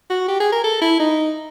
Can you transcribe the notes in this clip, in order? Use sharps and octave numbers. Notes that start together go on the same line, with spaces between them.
F#4
G4
G#4
A#4
A4
E4
D#4